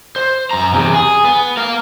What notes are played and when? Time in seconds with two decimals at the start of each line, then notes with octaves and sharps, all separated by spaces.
0.16 C5
0.51 F#2 A#5
0.74 E2 C3
0.94 G#4
1.25 B3
1.57 A#4 F5